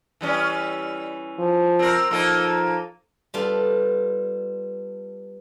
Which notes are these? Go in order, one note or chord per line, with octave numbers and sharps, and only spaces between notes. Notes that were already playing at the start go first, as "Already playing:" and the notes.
E3 G3 C#4
F3
C4 A#4
F3 A#3 D#4 A4
G3 B3 F4 A4